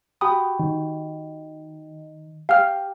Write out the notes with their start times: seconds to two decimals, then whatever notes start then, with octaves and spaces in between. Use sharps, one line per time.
0.21 F#4 G4 B5 D#6
0.59 D#3
2.49 G4 F5 F6